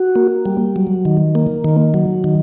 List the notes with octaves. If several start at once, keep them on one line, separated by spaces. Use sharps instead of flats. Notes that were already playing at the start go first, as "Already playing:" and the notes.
Already playing: F#4
A#3
G3
F#3
D#3
A#3
D#3
F#3
D#3